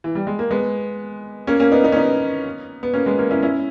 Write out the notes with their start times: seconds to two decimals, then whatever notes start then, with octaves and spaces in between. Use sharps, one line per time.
0.04 E3
0.15 G3
0.27 G#3
0.39 A#3
0.51 G#3 B3
1.47 A#3 C#4
1.60 A#3 C#4
1.72 B3 D#4
1.84 B3 D#4
1.92 C#4
1.97 B3 D#4
2.83 B3
2.94 A#3 C#4
3.06 G#3 B3
3.18 A#3 C#4
3.31 C#4 E4
3.43 C#4 E4